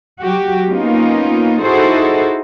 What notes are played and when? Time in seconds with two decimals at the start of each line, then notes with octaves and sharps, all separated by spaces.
0.22 F#3 F#4 G4
0.68 A#3 B3 C#4 D#4 F4
1.60 D#4 E4 F#4 G#4 A4 C5